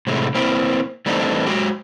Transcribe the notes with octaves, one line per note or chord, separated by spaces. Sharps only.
A2 C3 G#3 A3
A#3 C4 E4
E3 G3 A3 C4 D4 D#4
G#3 F#4 G4